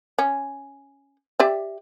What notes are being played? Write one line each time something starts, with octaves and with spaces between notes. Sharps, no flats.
C#4
G4 D5 E5